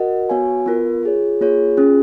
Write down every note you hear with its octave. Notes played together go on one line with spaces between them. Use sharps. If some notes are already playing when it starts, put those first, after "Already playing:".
Already playing: F#4 A#4 D#5 F#5
B3 F#4 C#5 F5 G#5
B3 F4 A#4
F4 G#4 C#5
A#3 F4 G#4 C#5
C#4 F4 G#4